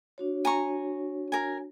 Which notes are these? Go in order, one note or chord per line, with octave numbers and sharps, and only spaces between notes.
D4 F#4 C#5
G#5 A#5 C#6
A#4 G#5